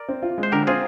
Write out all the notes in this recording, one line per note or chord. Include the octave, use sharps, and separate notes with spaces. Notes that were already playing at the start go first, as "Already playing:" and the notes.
Already playing: A#4 D5
C4
F4
G#3
C5
D3 G4 A#4
C4 F4 G#4